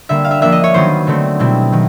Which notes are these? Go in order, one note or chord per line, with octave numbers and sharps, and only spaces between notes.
D3 G3 A#3 E5
F5
E5
F3 A#3 D4 E5
D#5
C#5
D#3 F#3 B3 C5
D3 F#3 A3 C4
B2 G3 C4 E4
D#3 F#3